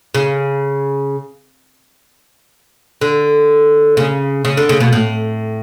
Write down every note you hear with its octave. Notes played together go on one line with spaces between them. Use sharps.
C#3
D3
C#3
C#3
D3
C#3
B2
A2